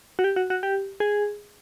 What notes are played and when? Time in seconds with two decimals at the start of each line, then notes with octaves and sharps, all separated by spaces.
0.19 F#4
0.24 G4
0.36 F#4
0.50 F#4
0.63 G4
1.00 G#4